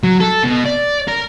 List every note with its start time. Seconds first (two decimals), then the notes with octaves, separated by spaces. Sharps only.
0.04 F#3
0.20 A4
0.43 B2
0.65 D5
1.08 A#4